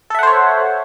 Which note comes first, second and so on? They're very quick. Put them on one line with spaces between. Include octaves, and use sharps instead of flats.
A4 E5 F#5 C5 C#5